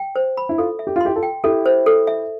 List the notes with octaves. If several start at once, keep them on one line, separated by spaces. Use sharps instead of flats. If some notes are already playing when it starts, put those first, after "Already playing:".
Already playing: G5
C5
B5
E4
F4 A4
E5
G4
F4
E4 G4 C6
F4 A4
G5
E4 G4 A4
C5
A4
E5